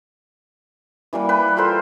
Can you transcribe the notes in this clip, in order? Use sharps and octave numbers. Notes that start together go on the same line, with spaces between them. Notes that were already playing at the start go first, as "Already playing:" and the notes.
E3 G3 A#3 B4
B4 G5
F4 A4 A#4 C5